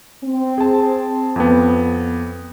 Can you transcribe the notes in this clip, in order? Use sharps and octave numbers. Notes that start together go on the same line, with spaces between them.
C4
G#4 A5
F2 B3